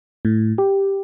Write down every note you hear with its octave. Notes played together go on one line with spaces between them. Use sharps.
A2
G4